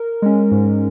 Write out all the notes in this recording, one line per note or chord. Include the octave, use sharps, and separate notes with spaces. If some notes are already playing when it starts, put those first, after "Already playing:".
Already playing: A#4
G#3 C#4
G#2